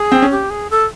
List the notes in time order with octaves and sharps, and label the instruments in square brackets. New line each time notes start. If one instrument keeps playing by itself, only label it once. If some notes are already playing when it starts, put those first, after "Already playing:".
Already playing: [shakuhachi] G#4
[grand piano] C4
C#4
[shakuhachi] G4
G#4
A4